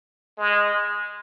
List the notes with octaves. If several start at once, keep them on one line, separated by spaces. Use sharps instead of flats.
G#3